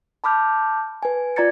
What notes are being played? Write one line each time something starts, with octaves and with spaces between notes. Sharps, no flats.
A5 B5 D6 F6 G6
B4 G#5
F4 D5 A#5 G#6 A6 C#7